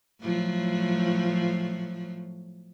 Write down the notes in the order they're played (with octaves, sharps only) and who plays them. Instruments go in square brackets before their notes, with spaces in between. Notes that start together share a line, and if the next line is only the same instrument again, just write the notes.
[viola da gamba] A2 F3 F#3